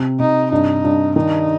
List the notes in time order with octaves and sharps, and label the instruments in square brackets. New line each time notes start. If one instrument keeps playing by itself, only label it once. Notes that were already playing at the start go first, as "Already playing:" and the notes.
Already playing: [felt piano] C3
[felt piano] C3 [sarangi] D#4
[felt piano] G2 [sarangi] D#4
[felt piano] G2
[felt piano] D#3 [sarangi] D#4